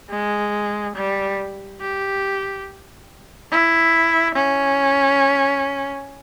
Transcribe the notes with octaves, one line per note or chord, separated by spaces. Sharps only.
G#3
G3
G4
E4
C#4